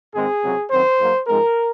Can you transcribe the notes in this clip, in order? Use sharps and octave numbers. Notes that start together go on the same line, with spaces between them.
G#2 D#3 G#3 C4 G#4
C#2 C3 F#3 C4
F#2 D#3 F#3 C4 C5
G#2 F#3 A#3
G#2 F3 G#3 C4 A#4